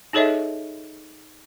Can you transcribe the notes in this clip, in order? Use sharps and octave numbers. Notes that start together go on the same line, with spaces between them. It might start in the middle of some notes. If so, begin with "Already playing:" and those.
D#4 G#4 A4 C#5 D#5 E5